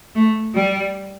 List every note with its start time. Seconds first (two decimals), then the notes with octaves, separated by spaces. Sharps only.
0.15 A3
0.54 G3